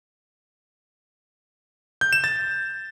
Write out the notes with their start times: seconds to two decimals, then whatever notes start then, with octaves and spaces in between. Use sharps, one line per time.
2.01 G6
2.13 E7
2.24 A6